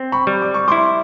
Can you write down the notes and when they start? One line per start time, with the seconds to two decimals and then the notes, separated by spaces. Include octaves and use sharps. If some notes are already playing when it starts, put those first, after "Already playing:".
Already playing: C4
0.12 B5 C#6
0.27 G3
0.42 D6
0.54 C#6
0.68 E4 C6 D6